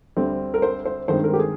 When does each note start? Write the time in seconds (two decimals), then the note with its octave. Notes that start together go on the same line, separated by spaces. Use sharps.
0.17 D2 D3 G3 C4
0.54 A#4
0.62 C5
0.85 C5
1.08 G2 D#3 G#3 C4 C5
1.24 A#4
1.34 G4
1.39 G#4